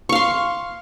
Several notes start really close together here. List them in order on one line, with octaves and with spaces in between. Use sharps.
C#6 F5 C6